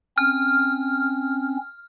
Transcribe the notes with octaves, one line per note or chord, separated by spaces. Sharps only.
C4 C#4 F6